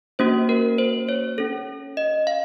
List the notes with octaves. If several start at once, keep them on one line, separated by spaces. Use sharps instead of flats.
A#3 C#4 F#4 C5
A#4
C5
C#5
C#4 A4
D#5
F5